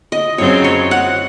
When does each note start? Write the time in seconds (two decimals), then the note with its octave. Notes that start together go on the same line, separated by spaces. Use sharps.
0.12 D#5
0.38 F#2 C#3 F#3 C4 C#5
0.64 C#5
0.91 F#5